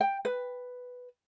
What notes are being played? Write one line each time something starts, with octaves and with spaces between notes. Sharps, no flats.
G5
B4